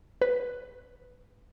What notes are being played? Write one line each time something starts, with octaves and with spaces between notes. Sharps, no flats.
B4